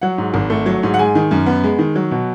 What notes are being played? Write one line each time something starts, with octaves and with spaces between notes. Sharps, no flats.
F#3 F#5
G#2
G#1
A3
F#3
G#2
F#5
G#3 G#5
D#3
F#2
B3
G#3
D#3
F#3
B2